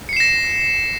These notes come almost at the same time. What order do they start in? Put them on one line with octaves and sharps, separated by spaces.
C#7 C7 E7 A#6